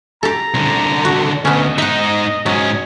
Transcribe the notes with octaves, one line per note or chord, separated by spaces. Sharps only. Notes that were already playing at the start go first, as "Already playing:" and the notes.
G4 A4 A#5
C2 D3
F#4
D2 B3 C#4 D#5
G#2 D#4 E5 F#5
G#2 F#3 C#4